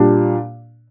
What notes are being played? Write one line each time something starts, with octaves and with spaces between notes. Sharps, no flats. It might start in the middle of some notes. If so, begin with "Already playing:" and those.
Already playing: A#2 G3 D4